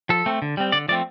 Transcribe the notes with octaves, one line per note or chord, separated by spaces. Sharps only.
F3 A4
A3 C4
D3
G3 C4
D3 D5
F3 A3 C4 D5